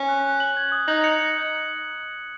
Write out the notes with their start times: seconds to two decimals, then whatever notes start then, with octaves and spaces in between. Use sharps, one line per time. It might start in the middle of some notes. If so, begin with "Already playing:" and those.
Already playing: C#4
0.08 F#6
0.25 F#6
0.40 F#7
0.57 G#6
0.72 D#6
0.88 D#4 F#7
1.04 C#7